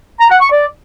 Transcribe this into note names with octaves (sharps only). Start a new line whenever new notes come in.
A#5
F#5
C#6
D5